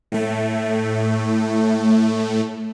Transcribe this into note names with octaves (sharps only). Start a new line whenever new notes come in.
A2 A3